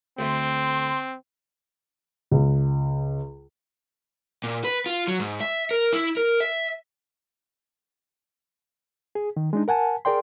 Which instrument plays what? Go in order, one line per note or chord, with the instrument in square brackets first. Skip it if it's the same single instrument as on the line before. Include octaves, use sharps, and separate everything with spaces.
[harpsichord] D2 A3 [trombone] C4 [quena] C6
[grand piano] C#2
[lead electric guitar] A#2
B4
F4
F#3
G#2
E5
A#4
E4
A#4
E5
[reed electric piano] G#4
D#3
G#3 D4 D#4
A#4 F#5 G#5 A5
G#4 A#4 D5 G5 C6